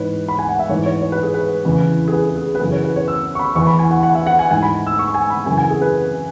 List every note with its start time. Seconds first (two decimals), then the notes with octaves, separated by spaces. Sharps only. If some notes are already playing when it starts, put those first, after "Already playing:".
Already playing: G#2 E3 B4 C#5
0.29 B5
0.39 G#5
0.49 F#5
0.59 E5
0.70 G#2 E3 C#5
0.86 C#5
1.01 C#5
1.12 B4
1.23 G#4
1.34 B4
1.65 E2 C#3 E3
2.08 G#4
2.13 B4
2.25 G#4
2.36 G#4
2.55 B4
2.60 F#2 C#3 E3 G#4
2.72 C#5
2.84 B4
2.96 C#5
3.08 E6
3.35 C#6
3.39 B5
3.55 E2 E3 C#6
3.67 B5
3.79 G#5
3.91 F#5
4.03 F#5
4.15 E5
4.27 F#5
4.39 G#5
4.51 G#2 E3 G#5
4.62 B5
4.87 E6
4.99 C#6
5.14 G#5
5.30 B5
5.46 F#2 C#3 E3 G#5
5.58 G#5
5.70 G#4
5.82 B4